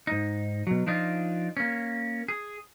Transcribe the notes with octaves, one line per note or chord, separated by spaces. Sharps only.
G#2 D#4
B2 F#3
F3 D4 D#4 F4
A#3 C#4
G#4